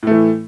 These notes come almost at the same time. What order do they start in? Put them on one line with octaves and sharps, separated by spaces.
A2 A3 E3